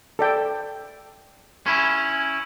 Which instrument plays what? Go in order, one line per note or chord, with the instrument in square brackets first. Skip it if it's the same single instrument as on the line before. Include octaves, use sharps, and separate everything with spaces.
[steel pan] A4 D5 G5
[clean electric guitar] C#4 E4